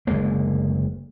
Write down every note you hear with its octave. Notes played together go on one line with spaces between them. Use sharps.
F#1 D2 G#3 A#3